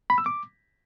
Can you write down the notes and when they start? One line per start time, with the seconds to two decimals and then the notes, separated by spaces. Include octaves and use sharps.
0.10 B5
0.18 E6
0.26 D6